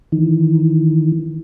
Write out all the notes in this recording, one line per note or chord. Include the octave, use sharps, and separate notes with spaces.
D#3 E3